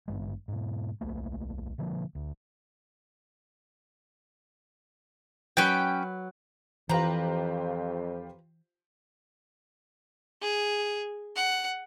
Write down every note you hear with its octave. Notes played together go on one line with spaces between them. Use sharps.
G#1 G2 G#3
G#2 B2
D1 B1 A3 A#3
B2 D3 F3 A#3
D2
F#3 C#4 B4 G5
F2 E3 F4 G4 B4 C5 A#5
G#4
F#5